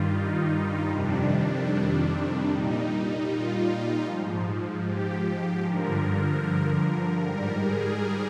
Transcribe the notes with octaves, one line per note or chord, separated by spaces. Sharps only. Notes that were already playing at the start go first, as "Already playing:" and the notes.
Already playing: G2 D#3 G3 F4
D#4
D#4
F2 C3 D#3 G3 D4
A#2 G3 D#4
D#4
F4
G#2 F3
G4
G2 D3 F3 A#4
G#2 G3 A#4
G#4